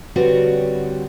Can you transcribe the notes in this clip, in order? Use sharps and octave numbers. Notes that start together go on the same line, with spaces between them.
D3 G3 C4 F#4 B4 C#5